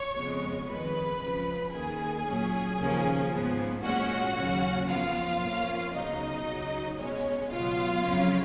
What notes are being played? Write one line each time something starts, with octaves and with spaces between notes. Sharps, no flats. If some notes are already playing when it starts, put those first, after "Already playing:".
Already playing: C#5 C#6
F2 C#3 G#3 B3
F2 D#3 G#3 B4 B5
C#2 C#3 F3
D#2 D#3 A#3 G#4 G#5
A#2 F#3 C#4
D#2 C#3 F3 A#3 C#4
G#2 F3 B3
A#2 G#3 C#4 F#4 F#5
D#2 C#3 F#3 C#4
F2 F3 B3 F4 F5
F2 F3 A#3 C#4
C#2 C#3 F#3 B3 D#4 D#5
C#2 C#3 F#3
B2 G#3 B3 C#4 C#5
C#2 B2 F#3 B3 F4 F5
F2 C#3 F#3 C#4